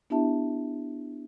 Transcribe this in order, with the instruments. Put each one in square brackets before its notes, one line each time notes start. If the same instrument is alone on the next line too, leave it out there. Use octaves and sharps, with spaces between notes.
[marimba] B3 D4 E4 G4 E5 A5